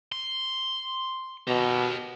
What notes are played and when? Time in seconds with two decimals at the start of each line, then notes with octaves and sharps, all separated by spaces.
0.12 C6
1.47 B2 G4 A#4